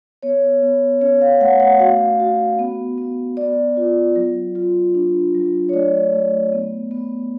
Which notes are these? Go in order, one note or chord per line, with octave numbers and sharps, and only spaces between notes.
B3 C#5
B3
C#4 C#5
F5
A3 F#5
F#5
F#4 F5
F#4
B3
B3
B3 D5
F4
F#3
F4
D4
F#3
C#5
A3 D5
A3
B3
B3